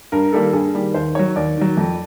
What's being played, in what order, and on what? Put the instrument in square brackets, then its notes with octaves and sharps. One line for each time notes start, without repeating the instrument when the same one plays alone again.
[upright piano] G2 A#4
D#3 G3 A#3 A4
G2 G#4
D#3 G3 A#3
D#2 C5
D#3 F#3 C#5
D#2 D5
D#3 F#3
F2